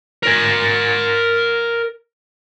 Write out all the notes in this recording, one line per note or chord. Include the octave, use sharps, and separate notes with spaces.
A#4 G#5